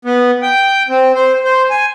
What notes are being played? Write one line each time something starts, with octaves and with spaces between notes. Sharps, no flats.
B3
G5
C4
C5
C5
G#5